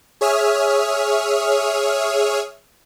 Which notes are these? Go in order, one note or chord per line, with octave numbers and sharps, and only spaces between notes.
G#4 C#5 E5 D#6 F6